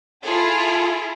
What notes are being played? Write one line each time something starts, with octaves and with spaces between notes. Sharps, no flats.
E4 F4 G#4 A4